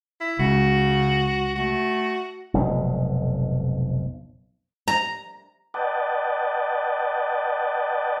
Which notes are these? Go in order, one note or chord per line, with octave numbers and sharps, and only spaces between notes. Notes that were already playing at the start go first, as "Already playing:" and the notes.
E4
C#2 C#3 F#4
A3 F#4
F1 B1 G#2
A#5
B4 D5 D#5 F#5 G5 A5